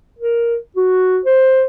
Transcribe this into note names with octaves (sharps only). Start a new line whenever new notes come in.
A#4
F#4
C5